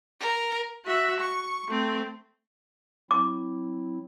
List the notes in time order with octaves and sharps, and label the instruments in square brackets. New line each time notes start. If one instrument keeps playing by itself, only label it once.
[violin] A#4
[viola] F#4 E5
C#6
A3 C4
[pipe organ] F#3 C4 E4 [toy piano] D6